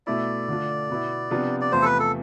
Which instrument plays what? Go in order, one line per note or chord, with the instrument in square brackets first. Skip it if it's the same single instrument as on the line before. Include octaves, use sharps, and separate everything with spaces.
[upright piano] B2 A3 E4 [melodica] D5
[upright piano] D3 A3 D4 F4
B2 B3 E4
C3 F3 B3 D4 F4
[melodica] D5
[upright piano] E2 C3 F3 A3 [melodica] C5
[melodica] A4
B4
A4